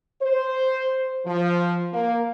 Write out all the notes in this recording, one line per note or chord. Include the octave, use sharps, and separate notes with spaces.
C5
F3
A#3